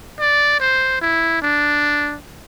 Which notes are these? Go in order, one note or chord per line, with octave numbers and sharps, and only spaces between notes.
D5
C5
E4
D4